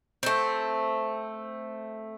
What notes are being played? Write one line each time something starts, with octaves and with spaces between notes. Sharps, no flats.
A3 C4